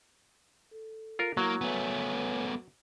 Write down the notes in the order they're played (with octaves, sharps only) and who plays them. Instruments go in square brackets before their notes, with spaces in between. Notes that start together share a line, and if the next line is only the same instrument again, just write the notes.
[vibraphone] A4
[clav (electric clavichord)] F4 A#4
[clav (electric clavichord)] F#3 [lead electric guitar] A#3 [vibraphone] E4
[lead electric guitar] A3 B3 [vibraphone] B4 C#5 G#5